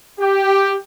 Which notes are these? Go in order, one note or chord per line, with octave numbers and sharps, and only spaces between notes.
G4